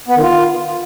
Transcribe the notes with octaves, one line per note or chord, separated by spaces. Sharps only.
B3
D#3
F4